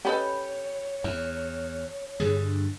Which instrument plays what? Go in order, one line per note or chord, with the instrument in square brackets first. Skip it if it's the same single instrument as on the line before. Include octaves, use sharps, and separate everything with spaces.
[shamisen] C#4 A4 D#5 [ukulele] G4 B4 B5 [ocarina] C#5
[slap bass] E2 [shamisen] E4
[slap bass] G2 D3 G3 [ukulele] G#4